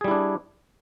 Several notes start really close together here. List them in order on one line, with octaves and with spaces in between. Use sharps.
G#4 G3 E4 D4